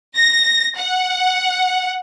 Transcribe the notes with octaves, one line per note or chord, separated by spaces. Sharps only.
A#6
F#5